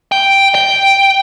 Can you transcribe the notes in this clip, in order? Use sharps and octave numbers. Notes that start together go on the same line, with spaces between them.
G5
G5